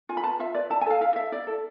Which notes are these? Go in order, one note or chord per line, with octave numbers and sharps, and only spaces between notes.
F4 G#5
B5
B4 A5
F4 E5
B4 D5
E4 A5
G#5
A4 F5
E4 F5
A4 E5
E4 D5
A4